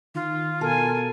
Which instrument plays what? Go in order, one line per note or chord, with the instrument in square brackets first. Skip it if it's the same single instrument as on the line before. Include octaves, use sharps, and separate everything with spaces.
[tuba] D#3 [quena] F4
[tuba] B2 [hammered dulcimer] A4 [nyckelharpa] A#4 G#5